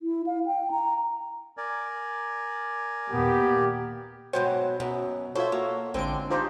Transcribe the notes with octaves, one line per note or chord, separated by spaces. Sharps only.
E4
F5
G5
A#5
A#4 D5 G#5
D#2 A#2 A#3 B3 G4
G#2 B2 F#3 C5 G5
F#2 B2
F4 F#4 A4 C5 C#5 E5
A#3 F#4
A1 D3 G#3 C4 D7
D4 D#4 F4 G4 C5